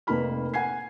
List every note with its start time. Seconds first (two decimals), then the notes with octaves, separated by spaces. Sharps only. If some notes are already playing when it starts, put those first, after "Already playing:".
0.07 F1 A#3 D#4 B4 B5 F6
0.54 F#5 G#5 G#6 C7